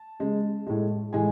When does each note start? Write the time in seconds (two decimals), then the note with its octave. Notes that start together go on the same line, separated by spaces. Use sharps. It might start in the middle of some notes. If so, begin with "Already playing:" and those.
Already playing: A5
0.20 C#3 G#3
0.67 A2 G#3
1.13 A2 E3 G#3 G#5